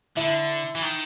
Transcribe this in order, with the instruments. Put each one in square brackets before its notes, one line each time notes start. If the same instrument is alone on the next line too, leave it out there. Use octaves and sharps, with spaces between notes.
[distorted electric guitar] D3 [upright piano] E4
[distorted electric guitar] E3
D#3